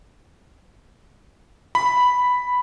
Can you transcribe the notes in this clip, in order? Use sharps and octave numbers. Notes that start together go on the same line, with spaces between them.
B5